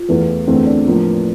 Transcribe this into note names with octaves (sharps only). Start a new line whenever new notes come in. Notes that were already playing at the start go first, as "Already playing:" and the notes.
Already playing: F4
E2 E3 A3
E2 D3 A3 C4
D4
A2 F3 A#3